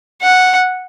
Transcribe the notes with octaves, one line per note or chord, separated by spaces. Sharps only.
F#5